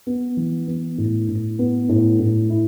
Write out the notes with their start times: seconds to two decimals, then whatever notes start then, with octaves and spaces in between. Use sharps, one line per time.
0.07 B3
0.37 E3
0.68 B3
0.98 A2
1.28 A2
1.59 B3
1.89 A2
2.20 A2
2.50 E4